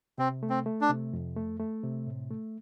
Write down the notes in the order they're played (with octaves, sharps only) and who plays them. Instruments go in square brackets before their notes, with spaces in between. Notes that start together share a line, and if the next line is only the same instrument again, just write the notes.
[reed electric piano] C3 [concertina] C4
[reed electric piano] A3
[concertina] C4
[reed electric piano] A3
[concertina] D4
[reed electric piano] C3
F2
A3
A3
C3
A2
A3